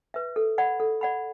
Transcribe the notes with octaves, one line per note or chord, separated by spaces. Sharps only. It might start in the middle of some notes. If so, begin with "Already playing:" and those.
B4 E5
A4
D5 F#5 B5
A4
D5 F#5 B5